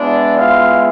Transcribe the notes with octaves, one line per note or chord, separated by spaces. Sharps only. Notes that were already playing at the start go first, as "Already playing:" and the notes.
Already playing: G#3 B3 D4 E4 D5
F4 F5